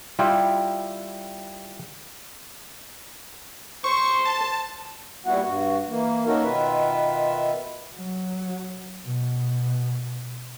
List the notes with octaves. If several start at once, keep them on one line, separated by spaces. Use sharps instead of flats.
G3 E4 F4 G4
C5 C#6
A5
A#2 G3 B3 E4 F#4 F#5
G2 F#4
E3 A#3
A#3 C#4 D#4 F#4 A4 A#4
B2 D#3 F4 B4 E5
F#3
B2